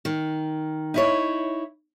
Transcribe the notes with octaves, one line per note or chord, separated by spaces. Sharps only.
D#3
D#4 E4 C#5